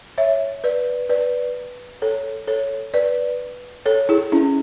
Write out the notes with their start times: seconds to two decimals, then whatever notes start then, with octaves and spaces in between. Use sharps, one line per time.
0.18 C#5 E5
0.64 B4 D5
1.09 B4 D5
2.02 A4 C#5
2.48 A4 C#5
2.94 B4 D5
3.86 A4 C#5
4.09 E4 G#4
4.32 C#4 E4